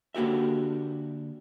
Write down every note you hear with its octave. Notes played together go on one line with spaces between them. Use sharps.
D3 A#3 F#4 G4 E5